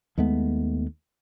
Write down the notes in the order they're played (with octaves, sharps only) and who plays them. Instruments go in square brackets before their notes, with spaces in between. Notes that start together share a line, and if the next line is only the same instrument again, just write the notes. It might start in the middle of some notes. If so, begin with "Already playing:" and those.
[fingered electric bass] D#2 G#3 A3 B3